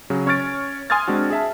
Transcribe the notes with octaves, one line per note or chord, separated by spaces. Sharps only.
C#3 F#3
C#4 C#5 C#6 F6 A6 D7
G#5 C6 D#6 F6 G#6 A6
G#3 C4 D4 F#4
G#4 E5 A5